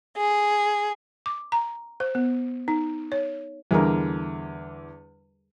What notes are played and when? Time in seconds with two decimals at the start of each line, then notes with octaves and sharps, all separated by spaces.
0.17 G#4
1.26 D6
1.52 A#5
2.00 C5
2.15 B3
2.68 D#4
3.12 C#5
3.71 E2 D3 G3 G#4 A#4